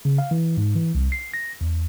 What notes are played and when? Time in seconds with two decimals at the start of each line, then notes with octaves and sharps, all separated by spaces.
0.05 C#3
0.18 F5
0.31 E3
0.57 G#2
0.76 E3
0.95 C2
1.12 C7
1.34 A#6
1.61 E2